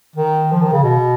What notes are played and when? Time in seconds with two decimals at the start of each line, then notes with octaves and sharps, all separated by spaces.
0.16 D#3
0.52 F3
0.62 D#3
0.73 C#3
0.83 B2